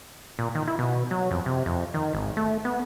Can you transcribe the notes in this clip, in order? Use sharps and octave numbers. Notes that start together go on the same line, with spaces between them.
A#2
D#3
E4
B2
F#3
F2
C3
F2
D#3
G#1
A3
B3